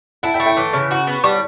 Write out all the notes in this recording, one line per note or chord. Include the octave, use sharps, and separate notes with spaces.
E4 F#5 A5
E5 G5
A3
E5 G5
E3
C#3
F#4
B3
G3 A5 C#6